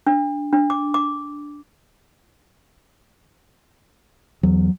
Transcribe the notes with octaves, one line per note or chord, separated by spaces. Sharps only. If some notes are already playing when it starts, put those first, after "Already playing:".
D4
D4
D6
D6
E2 F#3